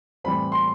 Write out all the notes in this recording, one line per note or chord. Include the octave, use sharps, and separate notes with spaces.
A2 E3 G3 C4 B5
C6